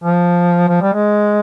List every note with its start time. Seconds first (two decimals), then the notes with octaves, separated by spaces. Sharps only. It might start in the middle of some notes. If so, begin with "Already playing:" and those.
0.04 F3
0.68 F3
0.82 G3
0.93 G#3